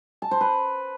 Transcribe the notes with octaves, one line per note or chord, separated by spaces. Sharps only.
A5
C5
B4